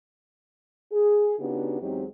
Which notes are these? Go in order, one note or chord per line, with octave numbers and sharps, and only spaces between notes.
G#4
C#3 B3 D4 D#4 F#4 G4
E2 F#3 G#3 C4 D#4 G4